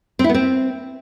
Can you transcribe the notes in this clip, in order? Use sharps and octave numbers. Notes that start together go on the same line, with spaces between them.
C4
E4
B3
C4